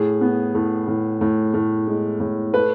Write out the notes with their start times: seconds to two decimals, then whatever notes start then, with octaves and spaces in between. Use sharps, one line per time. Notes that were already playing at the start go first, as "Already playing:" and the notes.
Already playing: A2 G#4
0.21 B3
0.55 A2
0.88 A2
1.21 A2
1.54 A2
1.88 G#3
2.20 A2
2.54 A3 B4